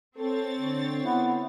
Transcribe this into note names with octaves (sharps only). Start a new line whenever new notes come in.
C4 A4 C#5 A6
D3
B3 E4